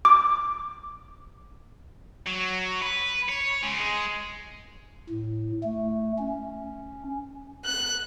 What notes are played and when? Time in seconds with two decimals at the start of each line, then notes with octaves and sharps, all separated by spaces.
0.05 D6
2.27 F#3
2.82 B4
3.29 C#5
3.62 C#3 G#3
3.79 G#3
5.10 A2
5.63 A3
6.18 C#4
7.65 F#6